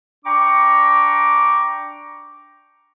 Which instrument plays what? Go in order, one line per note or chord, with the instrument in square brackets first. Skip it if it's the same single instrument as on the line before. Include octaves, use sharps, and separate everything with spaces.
[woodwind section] D4 G5 A#5 C#6 D6